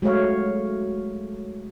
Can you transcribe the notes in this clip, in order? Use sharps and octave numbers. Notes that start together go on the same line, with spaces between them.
F#3 G#3 A3 C#5 F5